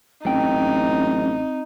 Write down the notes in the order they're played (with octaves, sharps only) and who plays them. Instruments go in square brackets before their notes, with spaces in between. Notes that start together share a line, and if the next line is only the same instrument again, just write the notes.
[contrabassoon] A1 [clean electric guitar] F#2 G5 [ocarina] C4 [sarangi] D#4